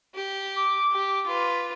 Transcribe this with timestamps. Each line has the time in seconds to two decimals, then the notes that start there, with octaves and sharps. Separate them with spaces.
0.15 G4
0.56 D6
0.92 G4
1.27 F4 B4